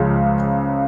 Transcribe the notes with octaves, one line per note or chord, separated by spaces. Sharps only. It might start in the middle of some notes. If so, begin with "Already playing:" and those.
Already playing: C#2 C#3 F3